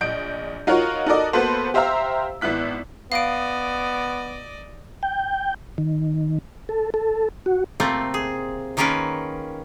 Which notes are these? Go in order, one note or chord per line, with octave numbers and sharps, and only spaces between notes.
A#1 D#5 G6 D7
D#4 F4 F#4 A#4 C#5
D#4 F#4 A4 A#4 D5 D#5
A#3 B3 F#4 A4 B4 C5
G4 C5 E5 F5 A#5 E6
G#1 B3 E4 F#6 B6
B3 D5 D#5 F5 D7
G5
D#3
A4
A4
F#4
C3 A3 A#3 C4 F4
G#4
D#3 A#3 C#4 F4 A#4 B4